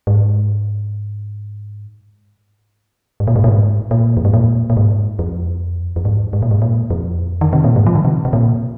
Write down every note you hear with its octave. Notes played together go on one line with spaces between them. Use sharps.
G#2
G#2
A#2
G#2
A#2
G#2
A#2
F2
G#2
A#2
A#2
G#2
F2
F2
G#2
G#2
A#2
G#2
A#2
F2
D#3
C3
A#2
G#2
F3
D#3
C3
C3
A#2